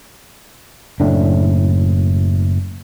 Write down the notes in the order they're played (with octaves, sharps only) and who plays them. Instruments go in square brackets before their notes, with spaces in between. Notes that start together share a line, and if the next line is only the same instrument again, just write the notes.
[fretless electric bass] F#1 A2 D4